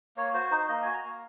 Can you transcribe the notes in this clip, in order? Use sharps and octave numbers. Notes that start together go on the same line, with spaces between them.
A#3 C#5
F#4 C5
D#4 C5
A#3 D#5
F#4 G#5
A#5
A#3